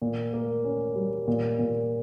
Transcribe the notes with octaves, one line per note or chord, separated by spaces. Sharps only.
A#2
A#3
C#4
G3
A#2
A#2